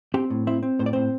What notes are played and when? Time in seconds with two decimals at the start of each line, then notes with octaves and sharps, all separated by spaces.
0.14 C4 G4 G5
0.30 A2
0.47 C4 E4 E5
0.63 C4
0.79 A2 C5
0.86 D5
0.93 A2 C4 C5